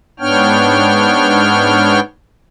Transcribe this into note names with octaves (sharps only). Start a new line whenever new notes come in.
G#2 B3 D4 C#5 G5 F6